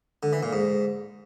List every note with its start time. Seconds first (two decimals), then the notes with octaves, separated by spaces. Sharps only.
0.23 D3
0.33 E3
0.43 A#2
0.53 G#2